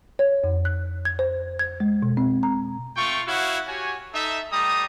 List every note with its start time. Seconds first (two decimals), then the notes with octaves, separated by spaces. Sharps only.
0.19 C#5
0.44 F2
0.65 F#6
1.05 G#6
1.19 C5
1.59 G#6
1.80 G#3
2.03 B2
2.17 C4
2.43 A#5
2.96 A3 F4 G5 C#6
3.27 E4 F#4 C#5 F5 F#5
3.67 F#4 G4 C#5 G#5
4.13 D#4 A4 E5
4.51 G3 A3 A#5 D#6